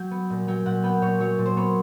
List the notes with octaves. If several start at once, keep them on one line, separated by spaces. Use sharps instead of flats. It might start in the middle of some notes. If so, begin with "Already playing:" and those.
Already playing: F#3 G5
B3
A#2
F#3 G5
A#2 F#5
B3 G5
A#2 C#5
F#3 C#5
A#2
C5
B3 C#5